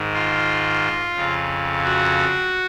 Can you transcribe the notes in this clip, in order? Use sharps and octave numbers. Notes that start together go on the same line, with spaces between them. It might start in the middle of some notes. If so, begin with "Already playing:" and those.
Already playing: G#2 D#3
F4
F2 C#3
F#4